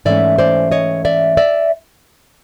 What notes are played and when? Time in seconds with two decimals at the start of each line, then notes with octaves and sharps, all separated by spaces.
0.05 G#2 E3 A3 C#4 D5 E5
0.38 C5 D5
0.72 C#5 D#5
1.05 D5 E5
1.37 D5 E5